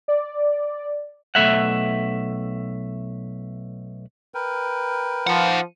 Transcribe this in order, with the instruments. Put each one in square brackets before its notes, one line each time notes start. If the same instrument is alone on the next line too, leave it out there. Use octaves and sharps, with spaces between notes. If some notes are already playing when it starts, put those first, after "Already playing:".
[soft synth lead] D5
[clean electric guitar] B1 A3 E5 F#5
[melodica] A#4 B4 G5
[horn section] F3 [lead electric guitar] D#4 F#5